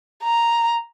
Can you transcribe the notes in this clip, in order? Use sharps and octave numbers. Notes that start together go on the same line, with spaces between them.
A#5